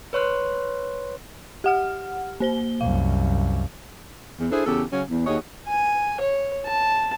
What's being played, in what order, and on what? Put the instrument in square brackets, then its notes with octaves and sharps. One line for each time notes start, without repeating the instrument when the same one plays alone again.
[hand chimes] B4 C#5 C6 F#6
[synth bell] G4 F#5 F6
A#3 C5 G7
[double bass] C2 F#2 [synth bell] F5
[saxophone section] E2
D4 E4 G#4 A4 C5
E2 C#3 G4 A4
C#3 F#3 C#4
E2
D#2 F#4 G#4 C#5 D#5
[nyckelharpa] G#5
C#5
A5